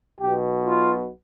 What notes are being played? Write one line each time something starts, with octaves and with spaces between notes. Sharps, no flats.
B1 B2 G4
F4